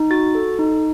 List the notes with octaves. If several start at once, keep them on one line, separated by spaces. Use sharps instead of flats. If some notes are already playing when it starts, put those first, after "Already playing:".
Already playing: D#4
F#4 A6
A4
D#4